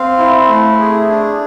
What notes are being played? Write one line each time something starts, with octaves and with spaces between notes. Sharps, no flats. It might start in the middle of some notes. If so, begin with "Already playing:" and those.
Already playing: C4 F5
E4
A3
G#4
D4